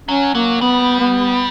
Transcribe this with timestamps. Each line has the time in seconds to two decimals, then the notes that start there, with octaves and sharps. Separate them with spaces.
0.08 F#3 C#4
0.35 F#3 A#3
0.61 G3 B3
1.00 B3